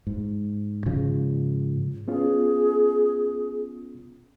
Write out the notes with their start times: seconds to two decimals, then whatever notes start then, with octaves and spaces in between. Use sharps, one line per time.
0.07 G#2
0.86 G#2 C#3 F3
2.08 B3 C#4 F4 G#4